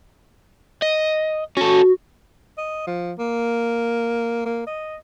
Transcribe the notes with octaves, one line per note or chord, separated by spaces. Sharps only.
D#5
C#4 F#4 A4
D#5
F3
A#3
A#3
D#5